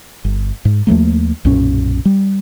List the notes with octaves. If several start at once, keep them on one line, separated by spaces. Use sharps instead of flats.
G1
G#2
D#2 F3 A3 A#3
B1 F#2 A#2 C#4
G3